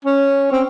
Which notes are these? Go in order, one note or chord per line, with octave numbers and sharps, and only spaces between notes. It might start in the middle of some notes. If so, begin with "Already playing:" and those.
C#4
C4